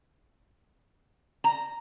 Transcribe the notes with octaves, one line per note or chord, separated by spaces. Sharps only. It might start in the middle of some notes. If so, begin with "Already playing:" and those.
A#5